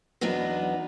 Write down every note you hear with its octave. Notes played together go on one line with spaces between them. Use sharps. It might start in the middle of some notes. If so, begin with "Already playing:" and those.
E2 F#3 B3 D4 D#4